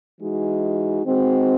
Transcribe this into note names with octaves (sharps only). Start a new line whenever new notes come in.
E3 G#3 D#4 F#4
D#3 G#3 C4 F#4